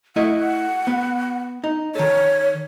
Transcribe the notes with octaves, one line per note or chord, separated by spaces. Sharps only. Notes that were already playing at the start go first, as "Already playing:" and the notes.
A3 E4 D#5 F#5
B3
D#4
D#3 A4 C#5